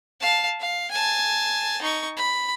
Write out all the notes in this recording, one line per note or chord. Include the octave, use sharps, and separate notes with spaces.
F5 A5
F5
G#5 A5
D#4 C#6
B5